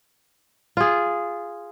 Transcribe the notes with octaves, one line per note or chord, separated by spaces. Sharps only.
F4 G#4